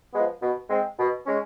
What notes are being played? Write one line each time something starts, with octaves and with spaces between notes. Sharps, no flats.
F3 G#3 B3
B2
G#3 C4
B2
G#3 C#4